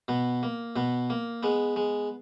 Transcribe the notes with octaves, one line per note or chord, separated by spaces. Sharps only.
B2 B3
A#3
B2 B3
A#3
G#3 B3
G#3